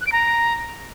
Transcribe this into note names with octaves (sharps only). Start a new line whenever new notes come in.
F#6
D7
A#5